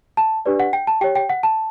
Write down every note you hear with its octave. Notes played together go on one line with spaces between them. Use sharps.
A5
D4 G4 B4 D5
F#5
G5
A5
G4 C#5 G5
G5
F#5
A5